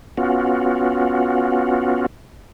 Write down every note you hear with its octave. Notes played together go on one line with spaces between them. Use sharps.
B3 C#4 F4 F#4